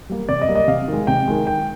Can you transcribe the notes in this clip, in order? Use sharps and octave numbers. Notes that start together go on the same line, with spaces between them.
G3 A#3
C3 D5
D#5
G3 A#3
D#5
C3 F5
D#3 G#3
C3 G5
D#3 G#3
D#3 G5